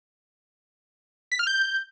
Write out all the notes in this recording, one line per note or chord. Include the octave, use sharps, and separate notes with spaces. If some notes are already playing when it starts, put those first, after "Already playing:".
B6
F6
G6